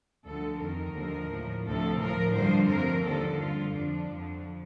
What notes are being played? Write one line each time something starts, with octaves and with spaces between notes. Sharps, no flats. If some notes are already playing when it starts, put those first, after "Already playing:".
D2 D3 F3 A4
F2 D#3 A#4
D#2 D3 F3
A2 F3
D2 C3 F3 A4
A2 F3 A#4
G2 D3 F3 C5
F2 C3 F3 A#4
D#2 D3 F3 A4
G2 F3 F4
F2 D3 F3 D4
F2 D3 F3